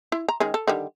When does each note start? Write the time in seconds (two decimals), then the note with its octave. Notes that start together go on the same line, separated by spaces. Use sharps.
0.12 E4
0.29 A#5
0.40 D#3 G#3 C#4
0.54 A4
0.68 D3 D#3 G3